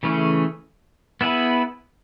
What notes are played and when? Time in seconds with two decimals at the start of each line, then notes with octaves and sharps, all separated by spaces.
0.03 C#3 E3 A3 C#4 G#4
1.21 B3 E4 G#4 B4